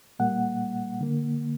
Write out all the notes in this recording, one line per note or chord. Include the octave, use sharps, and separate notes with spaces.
A#2 G3 A#3 F#5
D3 A#3